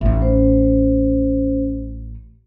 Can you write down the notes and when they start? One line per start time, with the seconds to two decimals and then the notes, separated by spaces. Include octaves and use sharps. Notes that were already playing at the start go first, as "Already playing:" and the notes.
0.01 A1 D#4 E5
0.20 C#4 C5